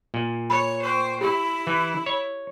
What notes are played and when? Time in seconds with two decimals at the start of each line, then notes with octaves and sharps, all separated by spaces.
0.14 A#2
0.50 C#5 B5
0.83 C5 G5 C#6
1.21 E4 G4 B5
1.67 E3
2.06 C#5